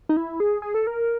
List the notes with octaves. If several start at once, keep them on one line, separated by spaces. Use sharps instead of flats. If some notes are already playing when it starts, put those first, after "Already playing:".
D#4
E4
G#4
G#4
A4
A#4